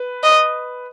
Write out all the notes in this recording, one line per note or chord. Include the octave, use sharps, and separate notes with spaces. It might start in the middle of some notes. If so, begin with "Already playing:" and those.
Already playing: B4
D#5